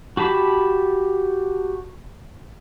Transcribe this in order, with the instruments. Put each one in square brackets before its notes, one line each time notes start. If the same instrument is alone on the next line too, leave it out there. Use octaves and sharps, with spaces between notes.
[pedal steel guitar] F#4 G4 A5 B5